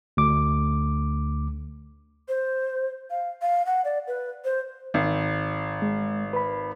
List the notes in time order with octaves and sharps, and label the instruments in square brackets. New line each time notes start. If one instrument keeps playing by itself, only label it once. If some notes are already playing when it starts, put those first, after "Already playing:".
[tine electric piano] D2 D6
[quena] C5
F5
F5
F#5
D5
B4
C5
[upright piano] G#1
[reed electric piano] G#3
B4 B5